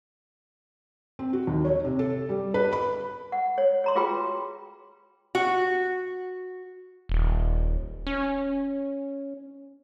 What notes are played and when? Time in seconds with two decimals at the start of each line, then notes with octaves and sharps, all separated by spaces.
1.19 C4
1.33 F#4
1.47 D#2
1.65 C#5
1.85 C3
1.99 A4
2.29 G3
2.54 B4
2.73 B5
3.32 F#5
3.58 C#5
3.84 C#5 A#5 C6
3.95 F4 F#4 G#4 B4 G5 B5
5.35 F#4
7.09 D#1
8.07 C#4